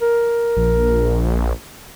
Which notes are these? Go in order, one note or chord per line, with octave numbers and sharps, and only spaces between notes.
A#4
A#1